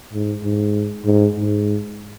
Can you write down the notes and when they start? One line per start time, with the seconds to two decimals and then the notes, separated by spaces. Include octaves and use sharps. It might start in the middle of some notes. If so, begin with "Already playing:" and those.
0.13 G#2
0.44 G#2
1.05 G#2
1.35 G#2